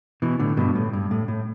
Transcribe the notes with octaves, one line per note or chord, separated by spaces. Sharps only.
B2 E3
A2 D3
G2 B2
A2
G2
A2
A2